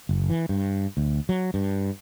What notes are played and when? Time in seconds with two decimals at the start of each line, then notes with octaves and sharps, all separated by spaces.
0.09 F#1
0.30 E3
0.49 G2
0.97 D2
1.29 F#3
1.54 G2